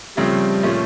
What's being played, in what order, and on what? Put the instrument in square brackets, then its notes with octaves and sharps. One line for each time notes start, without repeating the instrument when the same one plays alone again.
[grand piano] C#3 F3 A3 C4 [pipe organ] G3
[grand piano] A#2 F3 A3 C#4